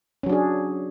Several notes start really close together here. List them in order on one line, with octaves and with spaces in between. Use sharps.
C#4 F#3 D4 G#4